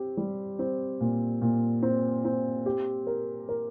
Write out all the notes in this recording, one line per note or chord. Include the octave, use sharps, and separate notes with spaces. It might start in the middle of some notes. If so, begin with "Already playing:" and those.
Already playing: C4 G4
G3
C4
A#2
A#2
C4
C4
G4
A#4
A#4